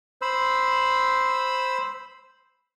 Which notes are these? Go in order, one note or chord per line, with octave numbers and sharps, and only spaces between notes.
C5 B5 E6